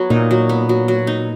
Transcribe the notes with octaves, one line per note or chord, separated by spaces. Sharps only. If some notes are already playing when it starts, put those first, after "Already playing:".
Already playing: F#3 B3
A#2 D#4
F#3
B3
F#3
F#3
D#4